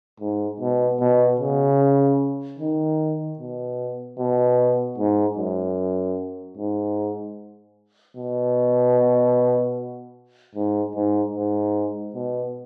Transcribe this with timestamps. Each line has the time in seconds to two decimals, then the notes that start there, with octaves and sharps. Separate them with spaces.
0.20 G#2
0.60 B2
1.00 B2
1.40 C#3
2.59 D#3
3.39 B2
4.18 B2
4.98 G#2
5.38 F#2
6.58 G#2
8.17 B2
10.55 G#2
10.95 G#2
11.36 G#2
12.15 B2